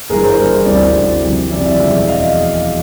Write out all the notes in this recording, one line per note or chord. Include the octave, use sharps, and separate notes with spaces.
G1 G2 E3 G#4 A#4
A#4 C5
G1 G2 E3
D2 C3 E3 G3 C5 D5
D2 C3 E3 G3
F2 C3 E3 G3
F2 C3 E3 G3 D5 E5
D5 E5
F1 E2 B2 G#3
D#5 F5